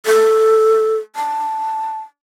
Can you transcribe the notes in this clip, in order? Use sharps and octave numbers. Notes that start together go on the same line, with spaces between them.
A4
A5